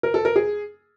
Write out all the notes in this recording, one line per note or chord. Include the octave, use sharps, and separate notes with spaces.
A#4
A4
A#4
G#4